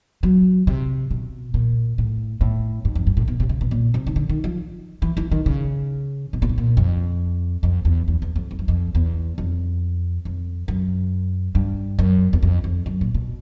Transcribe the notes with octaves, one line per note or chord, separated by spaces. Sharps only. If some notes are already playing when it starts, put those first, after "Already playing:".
F#3
C3
B2
A#2
A2
A2
G#2
F2
G2
A2
B2
C3
C#3
B2
A#2
C3
D#3
D3
D#3
F3
E3
E3
D#3
C#3
B2
A#2
A2
A#2
F2
F2
E2
E2
E2
F2
F2
F#2
F2
E2
F2
F2
F#2
G2
F#2
E2
F2
F2
F#2
A#2
B2